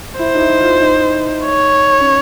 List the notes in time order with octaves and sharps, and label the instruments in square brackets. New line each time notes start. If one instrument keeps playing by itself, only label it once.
[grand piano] E4 [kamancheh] C5
[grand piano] D#4
E4
F4
D#4
[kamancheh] C#5
[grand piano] C#4